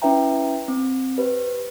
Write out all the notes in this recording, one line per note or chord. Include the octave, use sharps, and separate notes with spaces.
C#4 E4 B4 E5 G5 A#5
C4
G4 B4 C5